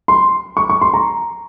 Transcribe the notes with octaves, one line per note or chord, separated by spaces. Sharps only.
C6
C#6
C#6
C6
A#5